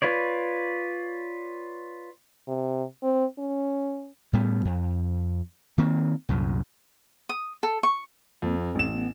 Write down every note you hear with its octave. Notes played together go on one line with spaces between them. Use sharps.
F4 B4 C#5 D5
C3
C4
C#4
A2 G3 B3
F2
D#3 A#3 C4
C2 F#2 A#2
D#6
A4
C#6
F2 A#3
C4
A1 E7
B3